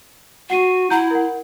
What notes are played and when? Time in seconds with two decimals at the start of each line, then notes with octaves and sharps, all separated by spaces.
0.50 F#4 F#5 C7 D#7
0.90 E4 F#5 A#5 G6
1.11 A#4 F#5